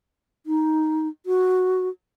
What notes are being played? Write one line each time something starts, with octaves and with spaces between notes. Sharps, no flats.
D#4
F#4